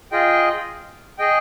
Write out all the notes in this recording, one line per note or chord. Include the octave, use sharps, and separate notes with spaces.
F4 G#4 D#5 G5
G#4 D#5 G5